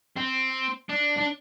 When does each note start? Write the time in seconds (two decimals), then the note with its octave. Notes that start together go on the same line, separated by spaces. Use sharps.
0.17 C4
0.90 D4
1.18 D4